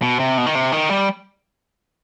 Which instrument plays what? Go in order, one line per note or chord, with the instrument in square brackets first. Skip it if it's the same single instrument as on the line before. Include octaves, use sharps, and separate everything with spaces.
[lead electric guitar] B2
C3
B2
D#3
C3
D#3
G3